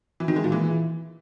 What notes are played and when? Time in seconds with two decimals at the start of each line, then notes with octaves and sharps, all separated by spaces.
0.20 E3
0.28 D#3
0.36 G#3
0.44 A#2
0.52 E3